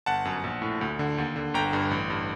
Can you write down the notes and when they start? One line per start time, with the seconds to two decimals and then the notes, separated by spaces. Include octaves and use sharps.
0.06 G1 F#5 A5
0.25 F#2
0.44 A#1
0.62 A2
0.81 D2
0.99 D3
1.18 D#2
1.36 D3
1.54 G1 G5 A#5
1.73 G2
1.91 A1
2.10 G2